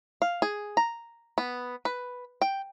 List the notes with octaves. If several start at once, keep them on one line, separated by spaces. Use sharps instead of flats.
F5
G#4
A#5
B3
B4
G5